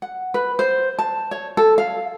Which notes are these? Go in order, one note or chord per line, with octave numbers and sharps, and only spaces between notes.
F#5
B4
C5
A5
C#5
A4
F5